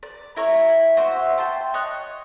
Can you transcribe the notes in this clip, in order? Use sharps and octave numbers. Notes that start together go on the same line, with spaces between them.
D5
E4 A#4 C#5
F#4 C5 E5
G5 A5 C6
C#5 D#5 F#6